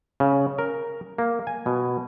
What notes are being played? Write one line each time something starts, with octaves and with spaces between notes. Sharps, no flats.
C#3
A#4
A#3
G#5
B2